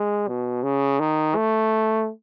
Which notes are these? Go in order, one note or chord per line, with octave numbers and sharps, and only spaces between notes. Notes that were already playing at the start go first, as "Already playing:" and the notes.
Already playing: G#3
B2
C#3
D#3
A3